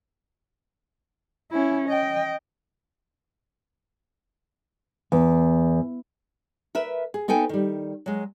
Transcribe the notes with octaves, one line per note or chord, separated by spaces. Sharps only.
C#4 E4
D#5 G5
E2
A#4 B4 E5
G#4
B3 D#4 A4 G5 G#5
D#3 G3
F#3 G#3